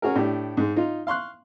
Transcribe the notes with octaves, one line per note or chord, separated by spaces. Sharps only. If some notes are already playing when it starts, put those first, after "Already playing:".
C#4 F#4 G#4 A#4
A2 D4 G4
G#2 G#3
D#4 F4
F5 C6 C#6 F#6